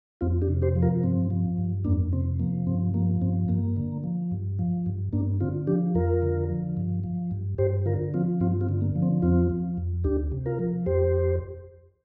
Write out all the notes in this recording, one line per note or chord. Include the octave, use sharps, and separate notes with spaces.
F2 C4 F4
D4 G4
C3
G4 C5
F3
F4 A#4
G2 C4
F3
G2
F2 A#3 D4
C3 C4
F3 A#3
G2 C4
F3 A#3
G2 C4
G2 A#3
D3
F3
G2
F3
G2
G2 A#3 D4
D3 C4 F4
F3 D4 G4
F2 F4 A#4
D3
F3
G2
F3
G2
G2 G4 C5
D3 F4 A#4
F3 C4 F4
G2 C4 F4
C4 F4
D3
A#3
F3
C4
F2 C4 F4
F3
F2
D2 D4 G4
C3
F4 A#4
F3
F2 G4 C5